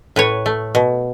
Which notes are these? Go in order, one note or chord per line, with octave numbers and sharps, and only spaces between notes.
A2 B4 C#5
A3
B2